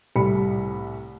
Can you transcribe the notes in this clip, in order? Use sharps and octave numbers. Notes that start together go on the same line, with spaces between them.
C2 A2 G3 B5 C#7